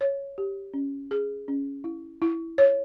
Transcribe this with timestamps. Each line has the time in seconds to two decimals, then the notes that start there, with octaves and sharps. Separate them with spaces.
0.01 C#5
0.38 G4
0.74 C#4
1.11 G#4
1.48 C#4
1.84 E4
2.22 E4
2.58 C#5